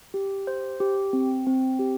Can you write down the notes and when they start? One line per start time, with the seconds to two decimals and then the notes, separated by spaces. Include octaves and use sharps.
0.14 G4
0.47 C5
0.80 G4
1.13 C4
1.47 C4
1.79 G4